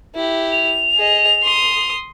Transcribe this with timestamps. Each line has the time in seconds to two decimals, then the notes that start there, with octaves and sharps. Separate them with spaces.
0.15 E4 G4
0.52 F7
0.97 G#4 D#5
1.43 C6 D#6